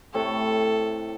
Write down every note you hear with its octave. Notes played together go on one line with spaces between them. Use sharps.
A2 C3 A4 C#5